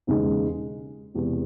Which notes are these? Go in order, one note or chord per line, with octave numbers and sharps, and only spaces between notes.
E1 D#2 C#3 G#3 D#4
E1 E2 C3